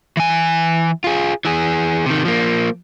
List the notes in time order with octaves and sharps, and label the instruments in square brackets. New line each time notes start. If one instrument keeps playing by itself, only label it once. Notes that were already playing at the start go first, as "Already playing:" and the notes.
[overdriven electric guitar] E3 G#5
F4 G#4
E3 G#4
C3 D#3
F3 A#3